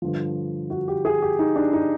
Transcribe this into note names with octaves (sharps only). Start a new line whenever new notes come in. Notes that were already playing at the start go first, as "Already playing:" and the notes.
G2 D3 F3
F#4
G4
G#4
G4
D#4
D4
D#4